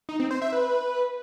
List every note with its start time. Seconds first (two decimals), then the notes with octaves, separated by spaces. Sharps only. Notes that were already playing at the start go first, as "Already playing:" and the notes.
0.09 D#4
0.20 C4
0.31 C5
0.42 E5
0.53 B4